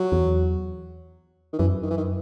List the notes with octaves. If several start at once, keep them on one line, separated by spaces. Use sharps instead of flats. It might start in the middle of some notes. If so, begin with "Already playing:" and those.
Already playing: F#3
E2
D#3
F#2 E3
D#3
E3
D#3